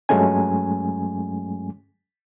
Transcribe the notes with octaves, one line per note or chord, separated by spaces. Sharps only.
G2 F#3 G#3 A3 C#4 G#5